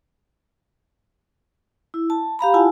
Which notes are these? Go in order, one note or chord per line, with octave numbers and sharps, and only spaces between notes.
E4
A5
G4 F5 A#5 B5
E4 F4 F#5 G#5 A5